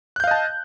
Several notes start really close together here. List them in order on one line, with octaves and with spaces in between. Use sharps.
F#6 G6 F5 D#5 A5